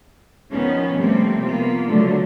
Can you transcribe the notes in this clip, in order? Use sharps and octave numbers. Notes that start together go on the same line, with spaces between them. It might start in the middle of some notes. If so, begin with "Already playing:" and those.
D#3 F3 B3 C#4
C3 F3 G3 A3 A#3 C4
A#3 B3 F4
D3 F#3 A3